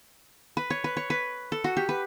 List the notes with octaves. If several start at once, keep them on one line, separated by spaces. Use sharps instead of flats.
B4
C#5
B4
C#5
B4
A4
F#4
G4
B4